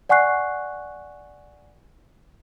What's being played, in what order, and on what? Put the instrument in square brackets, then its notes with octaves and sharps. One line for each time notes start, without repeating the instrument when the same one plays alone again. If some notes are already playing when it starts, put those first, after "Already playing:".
[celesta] D5 F#5 G#5 C#6 F#6 C7